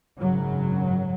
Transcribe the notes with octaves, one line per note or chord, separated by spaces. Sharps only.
G#1 F#2 C#3 F#3